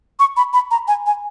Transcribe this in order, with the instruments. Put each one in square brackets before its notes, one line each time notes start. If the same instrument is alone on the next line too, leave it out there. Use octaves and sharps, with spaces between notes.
[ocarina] C#6
B5
B5
A#5
G#5
G#5